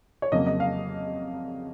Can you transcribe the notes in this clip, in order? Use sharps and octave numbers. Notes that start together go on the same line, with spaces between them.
C#5
F2 C#3 F#3 A#3 D#5
D#5
F5